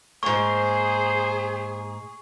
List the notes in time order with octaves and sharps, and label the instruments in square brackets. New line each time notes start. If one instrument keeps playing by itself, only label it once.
[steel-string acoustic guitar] G#2 A#3 [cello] G#4 [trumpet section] C5 [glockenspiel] C#6